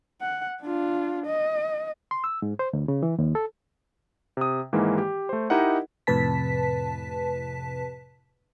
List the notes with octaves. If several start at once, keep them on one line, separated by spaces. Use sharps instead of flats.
F#5
D4 F4
D#5
C6
E6
G#2
C5
D2
C#3
E3
D#2
A4
C3 D#6
G#2 D#3 E3 G#3 A#3
G4
A3 C5
D#4 E4 G4 A#4 D#5 F#5
F2 A2 C3 B4 A5 B6